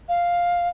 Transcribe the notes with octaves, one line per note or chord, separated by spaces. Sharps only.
F5